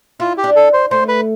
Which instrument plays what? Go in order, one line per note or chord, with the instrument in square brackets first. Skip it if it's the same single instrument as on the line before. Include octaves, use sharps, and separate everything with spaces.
[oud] E4 [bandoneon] F4
[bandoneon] G4
[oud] D4
[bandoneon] A4
C5
[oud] A3 [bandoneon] C5
[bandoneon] B4